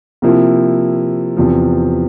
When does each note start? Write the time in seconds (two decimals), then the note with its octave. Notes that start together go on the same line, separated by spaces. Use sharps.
0.22 C3 F3 A#3 E4
1.36 E2 C3 F3